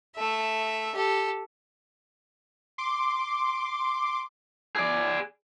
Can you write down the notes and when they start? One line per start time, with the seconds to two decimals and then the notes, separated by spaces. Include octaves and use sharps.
0.16 A3 E5
0.95 G4 A4
2.78 C6 D6
4.75 G#4 D5